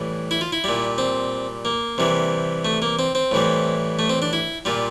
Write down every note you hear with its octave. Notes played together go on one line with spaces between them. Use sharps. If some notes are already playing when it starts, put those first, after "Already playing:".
Already playing: A2 E3 G3
E4
F4
E4
A#2 G3
C4
A#3
C3 E3 G3
A3
A#3
C4
C4
A2 E3 G3
A3
C4
D4
E4
A#2 G3 F4